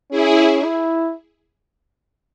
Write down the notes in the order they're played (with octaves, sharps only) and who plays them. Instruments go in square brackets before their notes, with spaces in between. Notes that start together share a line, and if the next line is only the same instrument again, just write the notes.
[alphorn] C#4 [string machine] E4 G#4
[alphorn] E4